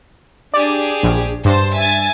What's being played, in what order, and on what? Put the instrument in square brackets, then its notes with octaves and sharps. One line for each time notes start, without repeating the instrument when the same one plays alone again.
[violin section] D4 G4 G#4 [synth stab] D5
[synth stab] A#1
[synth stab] G2 [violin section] C5 A5 C6
[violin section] E5 G#5 A6